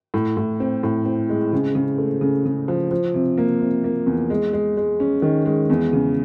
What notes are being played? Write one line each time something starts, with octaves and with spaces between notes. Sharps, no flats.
A2
A2
C4
A2
C4
G#3
C#3
C#3
A3
C#3
C#3
F3
F3
C3
A#3
C3
A#3
E2
G#3
G#3
G#3
C#4
D#3
G#3
E2
C#3